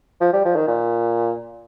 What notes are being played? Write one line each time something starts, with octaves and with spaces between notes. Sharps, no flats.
F3
G3
F3
D#3
A#2